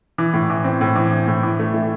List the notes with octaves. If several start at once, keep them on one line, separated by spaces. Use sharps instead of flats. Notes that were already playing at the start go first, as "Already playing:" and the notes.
E3
A2
E3
C4
A2
E3
E3
A2
E3
A3
A3